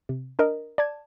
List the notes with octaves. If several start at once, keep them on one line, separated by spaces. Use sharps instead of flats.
C3
D4 A#4 D#5
D5 A5 G#6